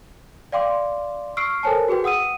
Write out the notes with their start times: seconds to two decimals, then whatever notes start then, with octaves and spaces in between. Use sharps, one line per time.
0.52 D5 F5 G5 C6 D6
1.37 C#6 E6 F6 C7 D7
1.63 A4 A#4 C5 C#5 G#5 A5
1.88 F#4 G#4 B4 G5
2.04 F#5 D#6 E6 D#7